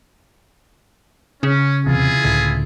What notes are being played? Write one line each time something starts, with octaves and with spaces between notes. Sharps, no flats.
C#3 C#4
D#1 E2 C3 E4 F4 G#4
C#2 A2 D3